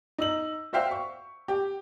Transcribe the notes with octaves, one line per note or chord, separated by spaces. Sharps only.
D#4 E6 F#7
F#4 C5 E5 F5 G5
C#6
G4